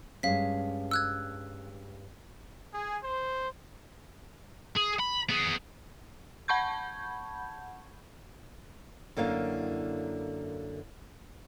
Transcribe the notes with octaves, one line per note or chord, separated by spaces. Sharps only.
G2 G#3 C#4 F5 B6
E6 F#6 G#6
G#4
C5
G#4
B5
B3 G#4
F#5 A5 B5 C#6 G6 G#6
F#2 D3 A#3 E4 F5